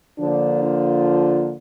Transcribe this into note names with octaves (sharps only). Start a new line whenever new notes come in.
D3 F3 A#3 D4
F4